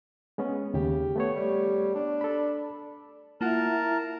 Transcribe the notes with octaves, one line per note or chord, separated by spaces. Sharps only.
G#3 B3 C#4
D#2 C#3 G4
A3 B3 C#5
G3
D4
A4 B5
A#3 E4 F4 A#4 E5 F#5 A5 A#5